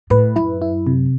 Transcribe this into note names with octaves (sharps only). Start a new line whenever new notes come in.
A2 B4
F#2 E4
E4
C3